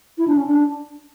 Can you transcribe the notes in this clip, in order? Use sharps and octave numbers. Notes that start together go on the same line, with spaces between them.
E4
D4
C#4
D4